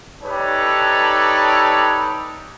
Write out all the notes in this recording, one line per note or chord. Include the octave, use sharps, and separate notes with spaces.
D#4 G4 A4 B4 C#5 D5